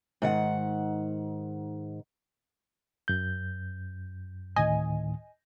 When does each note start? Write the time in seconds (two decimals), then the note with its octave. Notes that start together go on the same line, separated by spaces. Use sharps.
0.22 G#2 D#3 F#5
3.08 F#2 G6
4.56 D2 A2 D#3 D#5 G#5